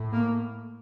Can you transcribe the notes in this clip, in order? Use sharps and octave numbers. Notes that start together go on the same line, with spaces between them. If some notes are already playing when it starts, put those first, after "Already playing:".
Already playing: A2
A#3